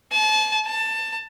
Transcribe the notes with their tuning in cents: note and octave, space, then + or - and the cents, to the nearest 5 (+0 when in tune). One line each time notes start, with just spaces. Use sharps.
A5 -35
A5 +20